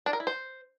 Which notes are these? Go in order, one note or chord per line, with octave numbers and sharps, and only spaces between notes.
D4
A#4
E4
C5